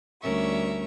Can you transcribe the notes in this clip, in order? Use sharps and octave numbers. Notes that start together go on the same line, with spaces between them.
D2 G3 C#4 A#4 E5 C#6